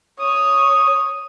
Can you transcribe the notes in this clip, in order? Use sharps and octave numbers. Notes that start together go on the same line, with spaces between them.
C#5 D#6